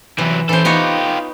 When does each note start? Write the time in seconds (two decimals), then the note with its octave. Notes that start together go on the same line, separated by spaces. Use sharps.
0.18 C3 E3 F#3
0.49 E3 C#4 A4 C5
0.65 B3 D#4 F4 G4 C#5